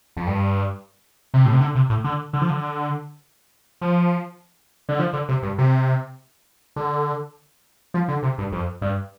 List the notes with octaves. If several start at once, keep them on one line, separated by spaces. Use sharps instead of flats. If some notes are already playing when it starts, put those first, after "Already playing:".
F2
G2
C3
A2
C3
D3
C3
A2
D3
D3
F3
D3
F3
D3
F3
D3
C3
G2
C3
D3
F3
D3
C3
G2
F2
G2